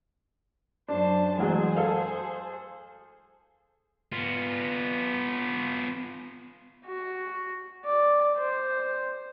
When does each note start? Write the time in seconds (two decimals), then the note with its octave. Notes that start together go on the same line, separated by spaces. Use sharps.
0.88 F#2 D4 C5 A5
1.38 A1 F#3 G#3 G#4 C5
1.76 A4 F5
4.12 B3 F4
6.86 F#4
7.85 D5
8.38 C5